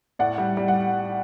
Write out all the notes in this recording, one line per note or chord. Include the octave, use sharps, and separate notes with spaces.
A2 D5 F#5
G3
G3
F#5